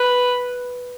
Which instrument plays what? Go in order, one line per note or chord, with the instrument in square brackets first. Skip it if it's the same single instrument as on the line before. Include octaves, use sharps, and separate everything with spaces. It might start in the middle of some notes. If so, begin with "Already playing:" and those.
Already playing: [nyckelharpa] B4